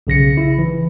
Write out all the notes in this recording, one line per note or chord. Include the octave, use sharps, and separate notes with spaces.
B1 C#3 A#6 C#7
E4
E3